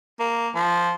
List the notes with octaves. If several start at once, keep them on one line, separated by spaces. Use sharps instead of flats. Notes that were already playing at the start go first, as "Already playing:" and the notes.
A#3
F3